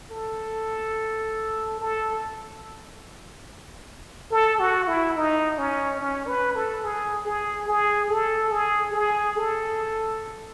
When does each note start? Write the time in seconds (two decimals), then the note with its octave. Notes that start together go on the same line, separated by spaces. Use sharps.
0.11 A4
1.80 A4
4.31 A4
4.60 F#4
4.87 E4
5.16 D#4
5.58 C#4
6.00 C#4
6.27 B4
6.55 A4
6.84 G#4
7.26 G#4
7.68 G#4
8.09 A4
8.52 G#4
8.93 G#4
9.36 A4